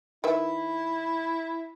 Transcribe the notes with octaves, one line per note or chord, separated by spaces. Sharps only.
D#3 E4 B4 E5